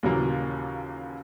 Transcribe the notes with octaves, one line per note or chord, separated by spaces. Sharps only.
D#2 A#2 C#3 E3 F#3 A#3